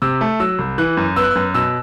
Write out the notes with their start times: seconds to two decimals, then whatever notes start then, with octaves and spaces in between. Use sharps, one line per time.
0.02 C3 E6
0.21 A3
0.40 F#3 E6
0.59 C2
0.78 E3 F#6
0.97 F#2
1.16 B3 E6
1.23 F#6
1.31 F#2 E6
1.54 B2 E6